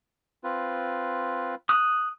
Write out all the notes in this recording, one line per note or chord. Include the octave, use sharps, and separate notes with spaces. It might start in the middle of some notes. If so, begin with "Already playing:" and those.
C4 F4 B4
D#6 F#6